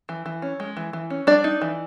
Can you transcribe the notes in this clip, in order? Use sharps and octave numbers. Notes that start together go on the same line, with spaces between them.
E3
E3
C#4
G#3
E3
E3
C#4
G3 D4 D5
D#4
E3